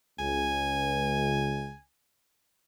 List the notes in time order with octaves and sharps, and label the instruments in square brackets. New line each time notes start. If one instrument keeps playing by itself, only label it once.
[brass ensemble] C#2 [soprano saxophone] G#5